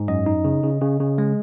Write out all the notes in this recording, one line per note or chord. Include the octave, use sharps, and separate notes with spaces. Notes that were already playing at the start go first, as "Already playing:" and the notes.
Already playing: G#2
F#2 D#5
D#4
C#3
C#3
C#3
C#3
G#3